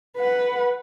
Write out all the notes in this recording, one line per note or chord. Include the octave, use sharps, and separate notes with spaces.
B4 F#5